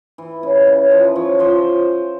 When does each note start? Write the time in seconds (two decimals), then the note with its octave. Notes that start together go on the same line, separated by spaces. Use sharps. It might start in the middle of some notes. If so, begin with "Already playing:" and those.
0.18 E3
0.43 C#3
0.67 C#3
0.91 F3
1.16 F3 C#5
1.39 F3 C5